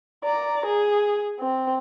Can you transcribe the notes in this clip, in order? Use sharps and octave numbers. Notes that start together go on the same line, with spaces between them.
D5 A#5
G#4
C4